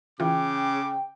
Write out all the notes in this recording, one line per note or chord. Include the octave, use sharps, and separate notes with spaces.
C#3 E3 F4 G5 D6